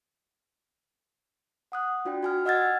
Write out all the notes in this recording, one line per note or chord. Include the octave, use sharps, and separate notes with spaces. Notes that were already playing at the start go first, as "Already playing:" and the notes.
F#5 D#6 F#6
D4 F4 F#4 D5 G5
F#4 G#5 F6
D#5 F#5 E6 F6 G#6 A6